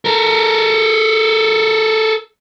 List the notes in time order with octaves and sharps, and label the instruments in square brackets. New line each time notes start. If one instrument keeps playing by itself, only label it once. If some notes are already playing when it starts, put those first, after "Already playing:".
[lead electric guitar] A4 A#4